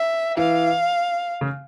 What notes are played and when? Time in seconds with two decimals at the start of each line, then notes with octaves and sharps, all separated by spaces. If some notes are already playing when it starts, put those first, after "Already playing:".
Already playing: E5
0.37 E3 F5
1.41 C#3